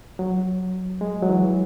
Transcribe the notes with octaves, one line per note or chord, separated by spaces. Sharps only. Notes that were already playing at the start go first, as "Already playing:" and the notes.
F#3
G#3
F#3
E3